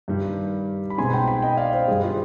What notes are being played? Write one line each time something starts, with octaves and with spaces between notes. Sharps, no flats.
G2 D#3 G3
B5
B2 G#3 C4 D#4 G#5 C6
G5 B5
G5 B5
D#5 G5
D5 F5
C5 D#5
G2 D#3 G3 G#4 C5
F4 G#4